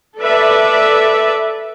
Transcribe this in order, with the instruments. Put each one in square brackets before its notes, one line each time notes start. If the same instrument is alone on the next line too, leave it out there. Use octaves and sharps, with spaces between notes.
[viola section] A4 B4 D5 E5